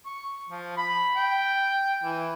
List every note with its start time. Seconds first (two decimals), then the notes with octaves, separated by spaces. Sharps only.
0.06 C#6
0.49 F3
0.77 B5
1.16 G5
2.03 E3